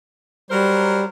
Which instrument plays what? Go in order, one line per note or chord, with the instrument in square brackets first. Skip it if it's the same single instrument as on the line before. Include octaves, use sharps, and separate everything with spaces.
[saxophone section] F#3 A#4 C5 [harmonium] G3